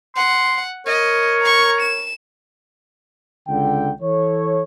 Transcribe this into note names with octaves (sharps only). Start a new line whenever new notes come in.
F#5 C6
A#4 C#5 D#5
A#5 C#6
E7
C#2 D3 G5
E3 A4 C#5